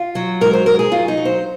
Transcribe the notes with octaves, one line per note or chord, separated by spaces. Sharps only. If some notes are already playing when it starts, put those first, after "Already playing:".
Already playing: F4
F#3
G#2 A#4
C5
G#2 A#4
G#4
F#3 F4
D#4
F#3
C5